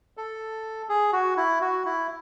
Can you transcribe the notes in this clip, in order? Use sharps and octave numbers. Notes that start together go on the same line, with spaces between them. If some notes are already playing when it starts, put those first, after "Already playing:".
A4
G#4
F#4
E4
F#4
E4